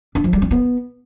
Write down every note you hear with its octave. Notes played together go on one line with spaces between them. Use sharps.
D4
F3
G3
C#4
B3